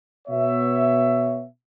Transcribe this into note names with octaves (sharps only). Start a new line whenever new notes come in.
B2 B3 C#5 E5